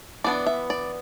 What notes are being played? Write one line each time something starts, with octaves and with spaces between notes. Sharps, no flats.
E3 B3 D4 D5
E5
D5